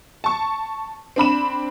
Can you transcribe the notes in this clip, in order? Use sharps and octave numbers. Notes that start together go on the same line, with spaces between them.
A5 C#6
C4 D4 B5 E7